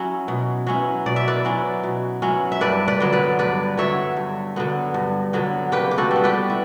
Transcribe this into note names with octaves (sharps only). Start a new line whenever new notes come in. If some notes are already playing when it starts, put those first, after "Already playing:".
Already playing: F#3 C#4 E4
B2
F#3 C#4 E4
B2 D5
E5
B4 D5
F#3 C#4 E4
B2
F#3 C#4 E4
E5
G2 B4 D5
B4 D5
D3 F#3 B3
B4 D5
G2 B4 D5
D3 F#3 B3 C#5 E5
G2
D3 F#3 B3
G2
D3 F#3 B3
C#3 G4 B4
G4
F#4 A4
G3
B3
G4 B4
E4